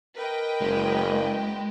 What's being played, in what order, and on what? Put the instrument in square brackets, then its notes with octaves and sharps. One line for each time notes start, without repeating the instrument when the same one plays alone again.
[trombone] A#4 [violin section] B4 D#5 G5
[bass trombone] F#1 [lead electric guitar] G#3